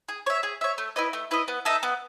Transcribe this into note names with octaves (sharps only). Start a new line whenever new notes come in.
G#4
C#5 E5
G#4
C#5 E5
A3
E4 B4 D#5
A3
E4 B4 D#5
B3
D#4 A4 E5
B3